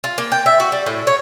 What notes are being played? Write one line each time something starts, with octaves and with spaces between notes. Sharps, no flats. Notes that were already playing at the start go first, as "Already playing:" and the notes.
F4
A#3
G5
E5
F#4
G3
A2
C#5